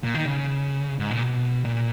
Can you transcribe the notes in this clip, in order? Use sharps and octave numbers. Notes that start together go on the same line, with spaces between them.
A#2
D#3
C#3
G#2
A#2
B2
A#2